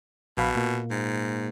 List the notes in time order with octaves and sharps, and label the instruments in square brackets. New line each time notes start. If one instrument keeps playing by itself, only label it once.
[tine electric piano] A#1 F5 B5 [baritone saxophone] B2
[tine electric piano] A#2 A#3
[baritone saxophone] G#2